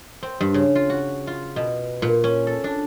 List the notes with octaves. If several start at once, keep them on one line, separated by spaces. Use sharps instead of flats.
C4
G2
C#3
F4
F#4
F4
B2
A#2
C#4
A4
D4